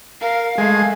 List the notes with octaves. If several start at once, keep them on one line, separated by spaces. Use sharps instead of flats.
A#4 F5
G#3 A3